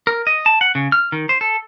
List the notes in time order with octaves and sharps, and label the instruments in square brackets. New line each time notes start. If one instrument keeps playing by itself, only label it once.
[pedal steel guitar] A#4
D#5
A5
F#5
C#3
F6
D#3
C5
A4